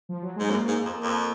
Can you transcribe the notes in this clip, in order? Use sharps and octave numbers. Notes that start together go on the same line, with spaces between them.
F3
F#3
G#2 G#3
F#2 A#3
G#2
F2
F2